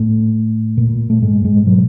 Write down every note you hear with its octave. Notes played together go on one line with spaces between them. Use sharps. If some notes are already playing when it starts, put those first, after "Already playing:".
Already playing: A2 A3
A#2
A3
G#2 G#3
G#2 G#3
B2 F#3